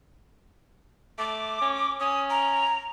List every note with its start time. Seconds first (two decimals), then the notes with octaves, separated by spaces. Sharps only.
1.18 A3 D6
1.61 C#4
2.00 C#4 D#6
2.30 A#5